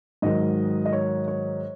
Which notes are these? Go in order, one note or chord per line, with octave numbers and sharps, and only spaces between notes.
G#2 D#3 F#3 D#5
D#5
C#5
C#5